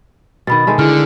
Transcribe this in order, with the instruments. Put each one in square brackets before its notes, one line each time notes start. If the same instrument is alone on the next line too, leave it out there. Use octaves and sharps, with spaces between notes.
[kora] B2 D#3 [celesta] B5 A6
[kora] D#3 G#3 A3
[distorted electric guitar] D3 [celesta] E4 G#4 F6